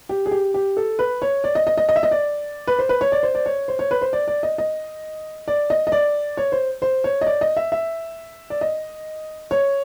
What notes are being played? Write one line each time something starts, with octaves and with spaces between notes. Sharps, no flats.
G4
G#4
G4
G4
A4
B4
C#5
D5
D#5
D#5
D#5
D#5
E5
D#5
D5
B4
C5
B4
C#5
D5
C5
D5
C#5
C5
C#5
B4
C5
D5
D5
D#5
D#5
D5
D#5
D#5
D5
C#5
C5
C5
C#5
D#5
D5
D#5
E5
E5
D5
D#5
C#5